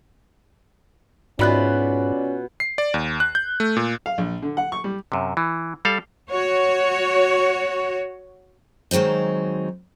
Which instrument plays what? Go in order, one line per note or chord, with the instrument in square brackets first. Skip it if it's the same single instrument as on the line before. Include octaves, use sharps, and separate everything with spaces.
[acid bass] G#2 [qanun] B2 E4 F4 [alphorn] C#4 [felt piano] D5 B5 F#6
[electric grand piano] C7
D5
D#2
F#6
G6
A3
A#2
[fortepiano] F5
A#1
D3
F#5
C#6
G3
[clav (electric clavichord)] F#2 C3
E3
G3 A4 F5
[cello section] F#4 C#5
[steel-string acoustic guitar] D#3 F#3 G#3 C4 D#4